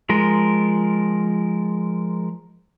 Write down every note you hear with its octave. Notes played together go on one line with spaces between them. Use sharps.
F3 G#3 A#4